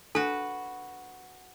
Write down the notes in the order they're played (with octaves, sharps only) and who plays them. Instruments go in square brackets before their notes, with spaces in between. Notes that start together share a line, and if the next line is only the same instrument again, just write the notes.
[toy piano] D4 A4 [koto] F#4 B4